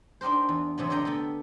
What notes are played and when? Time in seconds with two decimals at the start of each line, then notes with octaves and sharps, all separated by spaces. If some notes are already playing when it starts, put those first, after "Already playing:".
0.21 D4 D#4 G4 A#4 C5
0.49 E2
0.78 E2 C3 F#3 B3
0.90 D3 D5 D#5 G5 A#5
1.05 B3 G4 A4